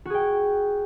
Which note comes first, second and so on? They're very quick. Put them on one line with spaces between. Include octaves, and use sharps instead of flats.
F#4 G#4 G5